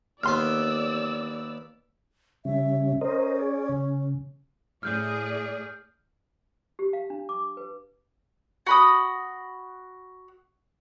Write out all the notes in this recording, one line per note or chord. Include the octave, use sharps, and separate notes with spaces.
D#2 B3 D5 C6 E6 F6
C#3 G3 C#4 E5
C#4 A#4 C5 D#5
G#4 C#5 D5
C#3
A2 G#4 D5 F6 G6
G4
F5
D4
D6
B4
F#4 B5 D#6